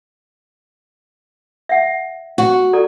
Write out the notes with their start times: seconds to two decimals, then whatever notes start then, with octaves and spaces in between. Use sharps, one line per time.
1.69 E5 F#5
2.38 F#4
2.73 A4 D5 A#5